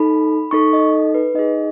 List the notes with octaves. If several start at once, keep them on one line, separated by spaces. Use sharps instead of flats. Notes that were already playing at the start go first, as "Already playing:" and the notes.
Already playing: D#4 A4 B5
D#4 A4 C#6
D#5
B4
D#4 G#4 D#5